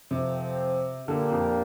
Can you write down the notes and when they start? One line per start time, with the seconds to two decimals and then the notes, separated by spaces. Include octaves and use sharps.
0.11 F2 C3 F3 C4
1.07 A#2 D3 A#3 D4 G4
1.32 F2